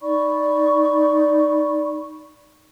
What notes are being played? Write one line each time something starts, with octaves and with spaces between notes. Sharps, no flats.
D#4 D5 B5 C#6